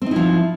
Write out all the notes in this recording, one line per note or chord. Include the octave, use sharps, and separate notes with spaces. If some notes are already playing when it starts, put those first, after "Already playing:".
F3 C4 D#4 E4